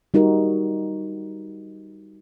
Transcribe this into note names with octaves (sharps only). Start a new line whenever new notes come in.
G3 D#4 F#4 A#4